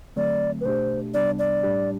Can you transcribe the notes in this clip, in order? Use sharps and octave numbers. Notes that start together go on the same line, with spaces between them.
D3 F#3 A3 C4 D5
B4
B2 A3 D4 G4 C5
C2 C3 G3 B3 D4 D5
D5
A2 G3 D4 G4